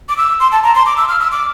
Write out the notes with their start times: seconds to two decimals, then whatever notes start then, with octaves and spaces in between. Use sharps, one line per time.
0.09 D6
0.17 E6
0.40 C6
0.52 A5
0.63 A#5
0.75 C6
0.86 D6
0.97 E6
1.08 F6
1.20 E6
1.32 D6